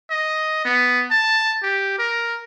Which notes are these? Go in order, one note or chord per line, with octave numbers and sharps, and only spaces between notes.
D#5
B3
A5
G4
A#4